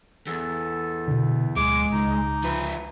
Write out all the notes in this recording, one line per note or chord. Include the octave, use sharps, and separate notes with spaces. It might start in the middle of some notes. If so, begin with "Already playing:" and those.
E2 A4
B2 D3
D1 G#3 D6
C#2 D#4
F3 B4